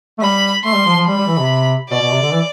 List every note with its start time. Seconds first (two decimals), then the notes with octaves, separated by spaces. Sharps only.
0.18 A3
0.22 G3 B5
0.64 A3 C6
0.75 G3
0.86 F3
0.96 F3
1.06 G3 B5
1.17 G3
1.27 E3
1.38 C3
1.90 B2 D5
2.00 B2
2.11 C3
2.22 D3
2.32 E3